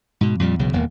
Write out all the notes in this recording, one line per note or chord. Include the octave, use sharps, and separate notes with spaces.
G#2 B2
F2 A#2 G3
B1 E2 C#3 F#3
D#1 E2 F#3 A#3